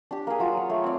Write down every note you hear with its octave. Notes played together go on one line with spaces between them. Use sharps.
D4 G4
A#3 G#4
F#3 F4
C#5
A3
C4 D5